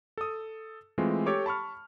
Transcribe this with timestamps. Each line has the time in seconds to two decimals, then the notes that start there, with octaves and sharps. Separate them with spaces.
0.17 A4 D#6
0.98 E3 G#3 A3 C4 F4
1.26 G4 A4 C#5 D6
1.46 A5 B5 C#6 F6